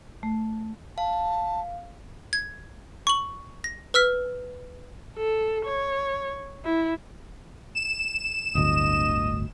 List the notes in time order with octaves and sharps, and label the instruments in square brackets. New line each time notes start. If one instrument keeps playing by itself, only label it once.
[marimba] A3
[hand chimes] F5 [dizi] A5
[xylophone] G#6
C#6 F#7
A#6
B4 E6 F6 B6
[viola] A4
C#5
E4
[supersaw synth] E7
[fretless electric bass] D1 G1 D2 [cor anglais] D#5